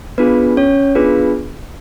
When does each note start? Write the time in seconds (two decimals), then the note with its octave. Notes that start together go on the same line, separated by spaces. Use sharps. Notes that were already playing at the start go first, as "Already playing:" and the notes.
0.18 B3 D4 F4 G#4 B4
0.57 C#4 C#5
0.95 B3 D4 F4 G#4 B4